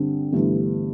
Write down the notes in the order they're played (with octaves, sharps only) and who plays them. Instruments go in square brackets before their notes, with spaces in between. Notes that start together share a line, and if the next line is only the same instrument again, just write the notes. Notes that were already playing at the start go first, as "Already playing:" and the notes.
Already playing: [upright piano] G2 D3 C4
G1 G2 E3 A3